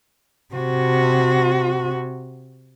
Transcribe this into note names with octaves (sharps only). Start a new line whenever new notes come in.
C3 F#4